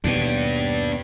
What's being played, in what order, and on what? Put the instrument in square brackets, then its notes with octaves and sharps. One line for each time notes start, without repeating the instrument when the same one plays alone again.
[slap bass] D#2 B2 [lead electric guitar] D4 G4